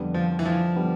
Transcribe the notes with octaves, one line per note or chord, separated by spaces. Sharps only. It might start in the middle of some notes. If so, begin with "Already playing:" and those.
Already playing: F2 D3 G3 B3
F3
E3
F3
D3 G3 B3